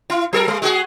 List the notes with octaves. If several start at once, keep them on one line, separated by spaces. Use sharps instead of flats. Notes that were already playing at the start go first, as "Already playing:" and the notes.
E4
F#3 A4 A#4
G3
G#3 F#4 G#4